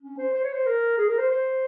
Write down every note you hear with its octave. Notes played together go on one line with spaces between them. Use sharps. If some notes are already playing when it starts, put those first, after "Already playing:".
C#4
C5
C5
C#5
C5
A#4
G#4
A#4
C5
C5